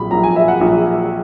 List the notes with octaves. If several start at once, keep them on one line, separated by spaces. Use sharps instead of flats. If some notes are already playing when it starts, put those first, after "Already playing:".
Already playing: A#1 A#2 F#3 B5
A#1 A#2 F#3 A#5
G#5
E5
F#5
A#1 A#2 F#3